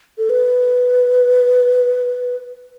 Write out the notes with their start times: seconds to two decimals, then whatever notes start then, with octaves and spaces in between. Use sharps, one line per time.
0.18 A4
0.30 B4